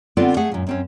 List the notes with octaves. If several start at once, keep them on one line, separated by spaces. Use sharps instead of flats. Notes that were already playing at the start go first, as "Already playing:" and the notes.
D3 B3 C4 F4 A4 D5
A3 G#4 F5 F#5
F#2 A#2
F#2 C4 C#4